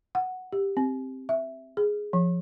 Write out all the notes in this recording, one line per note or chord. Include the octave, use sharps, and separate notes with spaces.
F#5
G4
C4
E5
G#4
F3